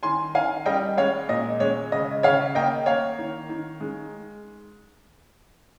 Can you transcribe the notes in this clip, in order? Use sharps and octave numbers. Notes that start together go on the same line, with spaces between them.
D#3 G#5 C6
D#3 F5 G#5
G3 D#5 G5
G#3 C#5 F5
A#2 D#5
G#3 C#5
C#3 D#5
C#3 C#5 F5
A#3 D#5 G5
A#3 C#5 F5
D#3
D#3
G#3